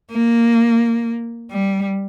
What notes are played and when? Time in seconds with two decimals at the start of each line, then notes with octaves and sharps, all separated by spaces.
0.11 A#3
1.51 G3